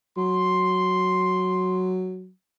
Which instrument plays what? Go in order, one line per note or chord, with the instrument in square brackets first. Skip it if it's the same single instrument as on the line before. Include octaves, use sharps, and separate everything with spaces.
[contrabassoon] F#3 [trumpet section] C6